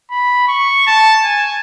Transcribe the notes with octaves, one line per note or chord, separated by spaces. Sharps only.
B5
C#6
A5
G#5